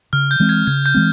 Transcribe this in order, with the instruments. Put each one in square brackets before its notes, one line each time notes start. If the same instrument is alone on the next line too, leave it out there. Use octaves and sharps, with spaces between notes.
[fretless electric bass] C#3 [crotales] F6
[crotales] G6
[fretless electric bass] E3 G#3 C4
[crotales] G#6
[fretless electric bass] C#3 [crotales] G#6
[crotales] G6
[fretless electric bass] E3 G#3 C4